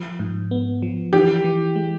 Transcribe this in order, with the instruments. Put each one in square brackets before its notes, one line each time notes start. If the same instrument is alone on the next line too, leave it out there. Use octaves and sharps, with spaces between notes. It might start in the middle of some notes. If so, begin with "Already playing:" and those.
Already playing: [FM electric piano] F3
G#2
B3
F3
[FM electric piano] E3 [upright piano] G4
[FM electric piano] E3
G#3